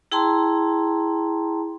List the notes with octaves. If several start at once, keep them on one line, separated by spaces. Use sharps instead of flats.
E4 G#4 G5 A5 A#5 C6